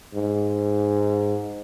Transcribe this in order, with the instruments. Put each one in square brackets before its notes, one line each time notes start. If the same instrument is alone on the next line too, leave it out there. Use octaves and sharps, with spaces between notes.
[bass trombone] G#2